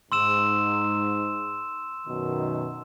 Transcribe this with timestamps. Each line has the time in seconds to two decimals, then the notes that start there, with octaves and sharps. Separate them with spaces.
0.12 G#2 C6 E6 E7
2.07 F#2 B2 D#3